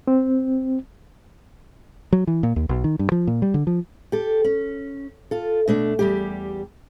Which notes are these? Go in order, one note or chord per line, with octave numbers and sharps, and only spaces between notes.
C4
F#3
E3
A#2
D#2
B1
D#3
G2
F3
A#2
G3
D3
F3
G4 A4
C#4
F4 A4
B2 A3 D4
E2 G3 G4